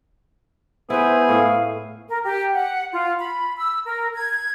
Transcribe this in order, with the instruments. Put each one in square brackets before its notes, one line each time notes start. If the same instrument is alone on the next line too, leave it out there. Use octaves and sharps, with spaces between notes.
[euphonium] B3 [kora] E4 B4 [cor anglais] G#4 [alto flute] C5
[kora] A2 [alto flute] F5
[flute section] A#4
G4
F#5
F4
B5
E6
A#4
G#6